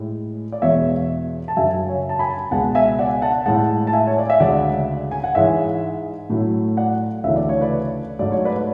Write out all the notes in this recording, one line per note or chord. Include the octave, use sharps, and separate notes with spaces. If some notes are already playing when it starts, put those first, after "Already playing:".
Already playing: A2 G#3
D5
E2 B2 G#3 C#5 E5
A5
F#2 C#3 F#3 E5 G#5
C#5
A5
G#5 B5
C#2 B2 G#3 F#5 A5
E5 G#5
D5 F#5
F#5 A5
A2 G#3 F#5 A5
A5
E5 G#5
C#5
D5
E5
D2 C#3 G#3 D5 F#5
G#5
F#5
G#2 E3 G#3 C#5 E5
A2 F#3 A3
D5 F#5
D2 C#3 E3 A3 E5
D5
C#5
B4 D5
G#2 F#3 A3 D5
C#5
B4 D5